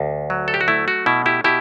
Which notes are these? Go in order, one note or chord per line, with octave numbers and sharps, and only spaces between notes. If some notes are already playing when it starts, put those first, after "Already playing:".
Already playing: D2
F#3
A4
G4
F#4
A3 E4
F#4
B2 E4
E4 G4
B2 E4 G4